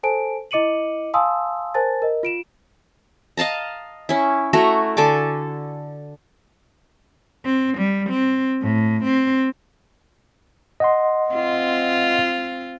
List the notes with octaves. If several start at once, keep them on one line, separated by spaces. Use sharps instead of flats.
A4 C5 G#5 A5 D7
E4 D#5 D6 C#7 D#7 F#7
F5 G#5 A5 C6 D#6 E6
A#4 C5 G#5 A5 A6
A#4 D#5
F4 D7 E7
D#5 F5 A5 A#5
C#4 E4
A3 E4 F#4 A#5
D3 A4 G#5 D6
C4
G3
C4
A2
C4
D#5 F#5 C6
C4 F4